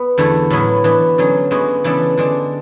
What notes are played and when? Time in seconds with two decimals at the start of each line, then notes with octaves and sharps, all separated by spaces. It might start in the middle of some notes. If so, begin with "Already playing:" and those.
Already playing: B3
0.18 E2 D3 A3 E4 A4
0.50 A2 F#3 B3 E4
0.84 E3 B3 D4 F#4
1.18 D3 F#3 C#4 G#4
1.51 D3 G#3 B3 F#4
1.84 C#3 E3 B3 D4 A4
2.17 D3 G#3 D4